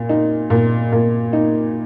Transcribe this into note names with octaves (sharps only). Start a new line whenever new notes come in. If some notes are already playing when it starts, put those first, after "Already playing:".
Already playing: A#2
D#4
A#2
A#2
D#4